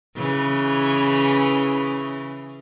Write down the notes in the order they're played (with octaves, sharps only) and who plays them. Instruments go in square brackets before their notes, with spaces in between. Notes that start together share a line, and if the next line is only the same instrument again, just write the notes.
[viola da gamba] C#3 E3